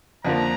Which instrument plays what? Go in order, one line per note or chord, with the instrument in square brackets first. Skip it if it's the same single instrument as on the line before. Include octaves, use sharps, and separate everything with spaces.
[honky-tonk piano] F2 D3 F3 A#3 [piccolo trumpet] A#5